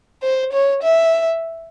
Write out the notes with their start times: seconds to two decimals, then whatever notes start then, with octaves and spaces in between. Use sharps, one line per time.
0.23 C5
0.52 C#5
0.83 E5